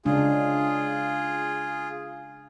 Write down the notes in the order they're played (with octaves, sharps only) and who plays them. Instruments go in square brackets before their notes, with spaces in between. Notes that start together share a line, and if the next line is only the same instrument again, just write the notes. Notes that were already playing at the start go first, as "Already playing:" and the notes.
[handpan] C#3 G#3 D4 [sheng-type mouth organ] F4 G#4